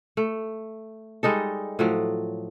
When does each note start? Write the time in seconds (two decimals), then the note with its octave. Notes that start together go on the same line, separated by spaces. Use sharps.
0.17 A3
1.23 G3 G#3 D#4 A4
1.79 A2 F3 F#3